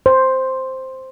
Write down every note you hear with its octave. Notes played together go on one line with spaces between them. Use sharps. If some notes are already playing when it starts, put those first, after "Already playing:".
C5